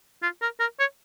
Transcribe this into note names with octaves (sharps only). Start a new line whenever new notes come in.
F4
A#4
A#4
C#5